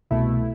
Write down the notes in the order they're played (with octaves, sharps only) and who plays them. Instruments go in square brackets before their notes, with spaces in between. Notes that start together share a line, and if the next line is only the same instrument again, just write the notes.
[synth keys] C2 B2 A3 E4